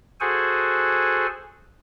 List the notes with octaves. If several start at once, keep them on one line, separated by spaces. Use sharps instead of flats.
F#4 G#4 A4 C5 F#5 G#5